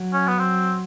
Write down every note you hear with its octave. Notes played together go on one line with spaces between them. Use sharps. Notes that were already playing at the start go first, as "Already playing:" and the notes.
Already playing: F#3
C#4
B3
C4